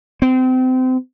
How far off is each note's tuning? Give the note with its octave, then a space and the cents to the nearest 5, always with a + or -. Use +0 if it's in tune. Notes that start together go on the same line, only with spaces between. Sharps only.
C4 -30